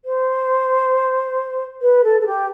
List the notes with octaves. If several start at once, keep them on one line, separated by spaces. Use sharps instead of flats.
C5
B4
A4
A4
G4